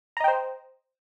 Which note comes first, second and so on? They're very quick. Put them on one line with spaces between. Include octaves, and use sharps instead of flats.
A#5 D#5 G5 C5